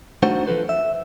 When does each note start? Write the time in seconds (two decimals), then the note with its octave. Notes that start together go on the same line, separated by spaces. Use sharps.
0.23 A3 D4 D#4 F#4 C5 F#5
0.46 E3 F3 A4 B4 C5
0.69 E5